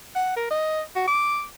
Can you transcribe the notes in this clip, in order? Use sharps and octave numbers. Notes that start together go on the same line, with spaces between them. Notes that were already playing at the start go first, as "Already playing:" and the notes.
F#5
A#4
D#5
F#4
D6